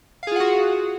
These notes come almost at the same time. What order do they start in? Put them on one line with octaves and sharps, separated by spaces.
F5 G#4 F4 F#5 F#4